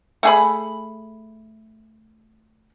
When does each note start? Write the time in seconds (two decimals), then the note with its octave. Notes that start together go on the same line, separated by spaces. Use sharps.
0.23 A3 G#4 B5